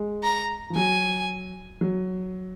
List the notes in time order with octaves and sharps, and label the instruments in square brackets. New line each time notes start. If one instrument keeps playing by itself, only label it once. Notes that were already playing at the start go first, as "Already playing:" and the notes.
Already playing: [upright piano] G#3
[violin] A#5
[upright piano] F3
[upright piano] F#3 [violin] G#5
[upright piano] F#3